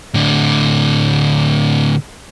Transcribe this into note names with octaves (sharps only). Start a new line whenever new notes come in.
A2 D3